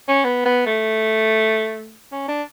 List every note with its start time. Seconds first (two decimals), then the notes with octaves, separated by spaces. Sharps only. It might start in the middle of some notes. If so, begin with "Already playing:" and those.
0.08 C#4
0.24 B3
0.45 B3
0.66 A3
2.12 C#4
2.28 D4